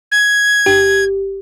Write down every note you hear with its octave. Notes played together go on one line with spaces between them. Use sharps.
G#6
G1 G4